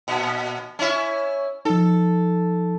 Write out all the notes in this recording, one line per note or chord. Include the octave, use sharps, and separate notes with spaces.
A#2
C#4 E4
F3 D#4 A4